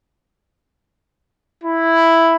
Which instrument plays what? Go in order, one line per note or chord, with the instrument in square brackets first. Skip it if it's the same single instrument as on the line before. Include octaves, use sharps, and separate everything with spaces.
[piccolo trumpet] E4